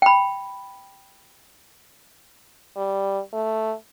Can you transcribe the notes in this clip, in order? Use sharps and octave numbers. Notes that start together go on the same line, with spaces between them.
G5 B5
G3
A3